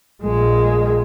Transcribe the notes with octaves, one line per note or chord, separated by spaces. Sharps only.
A#1 G#3